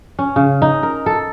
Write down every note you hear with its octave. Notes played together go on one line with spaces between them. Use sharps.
C#4
C#3
D#4
A#4
A4